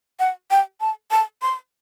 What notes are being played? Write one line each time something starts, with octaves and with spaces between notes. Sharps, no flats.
F#5
G5
A5
A5
C6